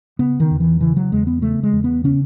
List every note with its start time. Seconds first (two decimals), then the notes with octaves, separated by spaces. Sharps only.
0.19 C#3 B3
0.40 D#3
0.51 E2
0.60 E3
0.81 C#3 E3
0.97 F#3
1.12 E2 G#3
1.27 B3
1.42 C#3 A3
1.63 G#3
1.73 E2
1.84 B3
2.04 C#3 C#4